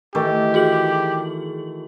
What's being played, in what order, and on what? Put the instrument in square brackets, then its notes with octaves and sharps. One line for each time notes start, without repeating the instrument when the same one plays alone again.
[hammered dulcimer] D#3 E3 A3 [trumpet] G4
[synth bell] F#4 G#4 F#7